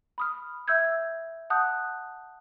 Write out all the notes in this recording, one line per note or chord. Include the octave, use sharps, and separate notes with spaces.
B5 D#6 F6
E5 E6 G6 G#6
F#5 A5 D#6 F#6 G6